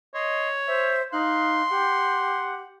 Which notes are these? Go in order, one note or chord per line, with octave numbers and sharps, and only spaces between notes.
C#5 D#5 C6
C5 E5
D#4 F5 C6 F#6
G4 F#5